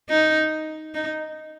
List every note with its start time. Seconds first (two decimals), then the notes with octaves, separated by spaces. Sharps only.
0.10 D#4
0.94 D#4